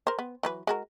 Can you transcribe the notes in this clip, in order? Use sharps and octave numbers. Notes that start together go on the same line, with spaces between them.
A#4 C5
B3
E3 F#3 B4
G#3 F#4 A#4